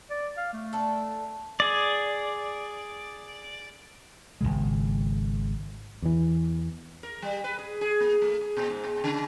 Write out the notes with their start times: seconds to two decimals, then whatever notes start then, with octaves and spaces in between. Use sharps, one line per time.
0.10 D5
0.37 F5
0.53 A3
0.73 D4 A4
1.60 G#4 D5
4.41 G#1 E2 C#3 G#3
6.02 E2 E3
7.03 A#4
7.22 G3
7.44 B4
7.59 G#4
7.81 G#4
8.00 A#3
8.22 A3
8.41 G#4
8.57 A#2
8.70 G#2
8.84 A#2
9.04 C#3